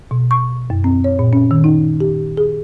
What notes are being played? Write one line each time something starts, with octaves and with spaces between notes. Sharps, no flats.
B2
C#6
F#2
C4
C#5
A#2
C#4
D#3
D#4
G4
G#4